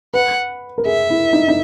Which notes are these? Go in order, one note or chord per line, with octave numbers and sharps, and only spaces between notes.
B4 F#5
A#4
G#4 E5
E4
D#4
D#4